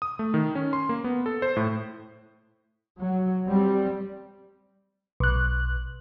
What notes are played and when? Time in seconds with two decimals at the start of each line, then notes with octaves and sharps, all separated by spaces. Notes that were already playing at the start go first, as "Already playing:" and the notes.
0.02 D#6
0.19 A3
0.34 D#3
0.55 C#4
0.73 C6
0.89 A#3
1.04 B3
1.26 A4
1.42 C5
1.56 A2
2.99 F#3
3.47 G3 C4
5.20 B1 F#6